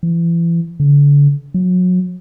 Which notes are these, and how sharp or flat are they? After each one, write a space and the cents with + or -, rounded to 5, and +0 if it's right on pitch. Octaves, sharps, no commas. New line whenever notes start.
E3 +35
D3 -40
F#3 -30